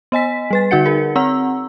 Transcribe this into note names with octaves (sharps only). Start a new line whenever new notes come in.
B3 D#5 G#5 B6
G3 B4 A6
D3 D#4 F#4 F#5 C#7
G#4 A#4
C4 F#5 A#5 E6